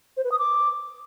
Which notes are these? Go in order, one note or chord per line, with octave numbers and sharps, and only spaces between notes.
C5
B4
D#6
D6